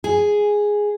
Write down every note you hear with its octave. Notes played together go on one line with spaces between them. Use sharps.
G#4